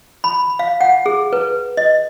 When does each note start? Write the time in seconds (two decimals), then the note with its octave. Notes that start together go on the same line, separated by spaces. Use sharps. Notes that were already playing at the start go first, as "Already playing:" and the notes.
0.24 B5
0.59 F5
0.81 F#5
1.06 G#4
1.33 B4
1.77 D#5